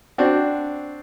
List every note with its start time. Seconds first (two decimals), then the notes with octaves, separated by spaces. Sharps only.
0.18 C4 D4 F#4